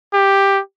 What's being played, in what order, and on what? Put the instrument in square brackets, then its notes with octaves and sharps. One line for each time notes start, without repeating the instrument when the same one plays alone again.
[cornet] G4